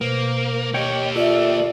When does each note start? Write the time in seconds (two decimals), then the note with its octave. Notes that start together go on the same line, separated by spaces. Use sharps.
0.01 B2 A#3 C5
0.74 A#3 G4 C#5 D#5 G5 C#6
1.16 F4 A4 D5 E5